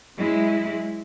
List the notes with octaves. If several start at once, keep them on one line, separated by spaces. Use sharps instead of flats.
F#3 G#3 E4